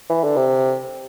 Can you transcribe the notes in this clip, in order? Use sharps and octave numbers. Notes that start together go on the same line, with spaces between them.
E3
D3
C3